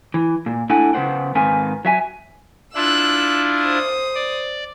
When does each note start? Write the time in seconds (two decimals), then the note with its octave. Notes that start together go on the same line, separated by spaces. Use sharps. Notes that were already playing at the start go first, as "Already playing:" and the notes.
0.14 E3
0.46 A#2
0.70 A3 D4 E4 F#5 G#5
0.93 C#3 B3 F#4 C5 F#5 G5
1.35 G#2 D#3 C4 B4 F5 G#5
1.85 F#3 E5 G#5
2.75 D4 E4 F4 E6 F#6
3.61 C5 D#6
4.14 D5